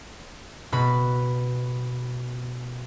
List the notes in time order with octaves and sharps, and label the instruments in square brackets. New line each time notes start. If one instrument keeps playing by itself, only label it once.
[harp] B2 B4 B5